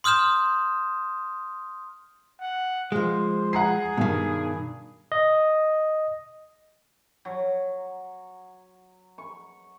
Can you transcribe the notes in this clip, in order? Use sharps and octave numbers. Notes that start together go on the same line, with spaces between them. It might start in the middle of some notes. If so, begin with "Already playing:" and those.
C6 D#6 F6 G6 E7
F#5
F3 G#3 C5
G#4 F#5 A#5 C7
G2 B2 D#3
D#5
F#3
C#6